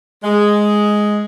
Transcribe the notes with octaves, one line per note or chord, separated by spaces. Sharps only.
G#3